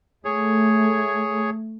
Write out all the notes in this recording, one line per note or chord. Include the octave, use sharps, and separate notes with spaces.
A3 G#4 C#5